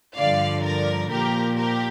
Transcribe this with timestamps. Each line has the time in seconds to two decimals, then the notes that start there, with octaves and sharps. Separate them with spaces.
0.17 G2 D3 F3 D5 F5
0.64 A#4 D5
1.11 A#2 F3 G4 A#4
1.57 G4 A#4